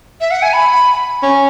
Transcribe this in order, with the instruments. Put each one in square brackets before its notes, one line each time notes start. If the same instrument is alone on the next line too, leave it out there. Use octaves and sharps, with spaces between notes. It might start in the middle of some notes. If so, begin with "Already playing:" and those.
[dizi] E5
F#5
G#5
B5
[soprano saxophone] C#4